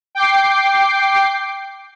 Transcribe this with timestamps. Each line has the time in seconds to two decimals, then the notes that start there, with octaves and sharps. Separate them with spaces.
0.15 G5 D6 C7